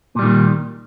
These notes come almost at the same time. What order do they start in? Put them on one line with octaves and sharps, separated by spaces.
A#2 G3 D#3